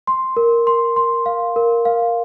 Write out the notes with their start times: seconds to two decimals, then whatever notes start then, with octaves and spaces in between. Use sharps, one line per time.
0.07 C6
0.37 A#4
0.67 C6
0.96 C6
1.26 F5
1.56 A#4
1.85 F5